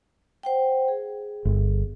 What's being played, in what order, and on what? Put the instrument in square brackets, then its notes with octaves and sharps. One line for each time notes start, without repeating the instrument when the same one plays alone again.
[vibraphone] C5 F#5 G5
G#4
[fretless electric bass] G1